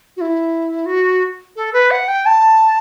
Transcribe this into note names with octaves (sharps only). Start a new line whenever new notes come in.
F#4
E4
F#4
A4
B4
F#5
G5
A5